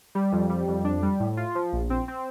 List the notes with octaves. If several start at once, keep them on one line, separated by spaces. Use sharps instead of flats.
G3
F2
G3
F2
D4
G3
A2
F4
F3
A#1
C4
C4